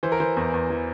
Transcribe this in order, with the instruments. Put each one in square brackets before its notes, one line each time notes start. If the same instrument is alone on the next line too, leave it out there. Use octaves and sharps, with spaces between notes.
[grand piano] E3 C5
A#4
E3 C5
E2
E2
E3